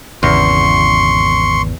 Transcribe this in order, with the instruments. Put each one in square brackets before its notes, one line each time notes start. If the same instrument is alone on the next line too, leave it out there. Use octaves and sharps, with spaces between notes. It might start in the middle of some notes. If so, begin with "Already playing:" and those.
[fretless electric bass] G#1 C#3 [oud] E2 [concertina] C6 C#6